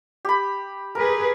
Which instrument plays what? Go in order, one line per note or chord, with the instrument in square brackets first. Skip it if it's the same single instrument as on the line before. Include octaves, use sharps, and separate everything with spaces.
[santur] G4 B5
[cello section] G#4 B4 [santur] A#4